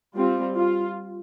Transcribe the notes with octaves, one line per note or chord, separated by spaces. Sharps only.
G3 C4 F4
F4